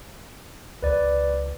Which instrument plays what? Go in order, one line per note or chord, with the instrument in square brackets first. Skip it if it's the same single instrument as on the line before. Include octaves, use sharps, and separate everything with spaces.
[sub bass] C#2 [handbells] B4 D5